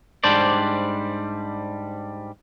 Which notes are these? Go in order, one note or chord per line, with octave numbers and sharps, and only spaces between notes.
G#2 G3 D4 C5 D5